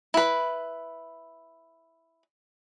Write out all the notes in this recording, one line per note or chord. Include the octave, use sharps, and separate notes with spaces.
E4 B4